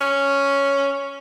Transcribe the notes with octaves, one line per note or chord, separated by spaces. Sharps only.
C#4